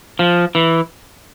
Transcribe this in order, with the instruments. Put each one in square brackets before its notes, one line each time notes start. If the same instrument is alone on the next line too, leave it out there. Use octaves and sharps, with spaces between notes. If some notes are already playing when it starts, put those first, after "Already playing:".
[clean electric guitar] F3
E3